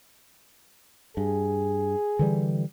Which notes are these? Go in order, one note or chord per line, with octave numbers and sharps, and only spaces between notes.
G2 G#4
D3 E3 G3